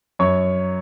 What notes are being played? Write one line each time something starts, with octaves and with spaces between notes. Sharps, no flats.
F#2 C#5 C#6